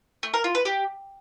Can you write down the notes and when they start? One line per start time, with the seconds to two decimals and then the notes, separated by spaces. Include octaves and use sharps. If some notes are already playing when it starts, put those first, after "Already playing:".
0.23 A3
0.34 A#4
0.44 F4
0.55 B4
0.65 G4